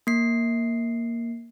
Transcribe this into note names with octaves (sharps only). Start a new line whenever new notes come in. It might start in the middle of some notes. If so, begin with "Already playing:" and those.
A#3 C7